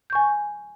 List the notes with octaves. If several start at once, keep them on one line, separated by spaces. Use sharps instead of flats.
G#5 C#6 G6